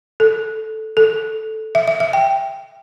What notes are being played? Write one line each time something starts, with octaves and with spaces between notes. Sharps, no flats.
A4
A4
E5
E5
E5
G5